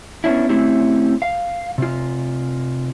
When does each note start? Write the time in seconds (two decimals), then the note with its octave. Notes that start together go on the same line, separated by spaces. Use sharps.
0.24 B3 C#4 D4 E4
0.49 A3 C4 C#4 E4 G4
1.22 F5
1.78 C3 F4